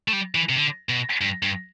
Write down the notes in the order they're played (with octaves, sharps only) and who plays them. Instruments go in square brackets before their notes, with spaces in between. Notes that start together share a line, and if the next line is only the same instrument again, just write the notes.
[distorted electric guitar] A3
G3
E3
C3
D3
B2
G2
G2